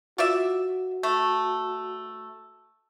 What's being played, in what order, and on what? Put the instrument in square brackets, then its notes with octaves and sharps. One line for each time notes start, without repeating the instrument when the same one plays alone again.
[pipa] F4 D5 E5 [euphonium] F#4
[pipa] A3